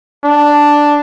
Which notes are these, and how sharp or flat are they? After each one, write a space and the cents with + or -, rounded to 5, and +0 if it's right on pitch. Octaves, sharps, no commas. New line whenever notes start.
D4 +0